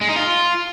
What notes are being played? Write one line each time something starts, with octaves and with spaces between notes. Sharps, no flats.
G#3
D#4
F4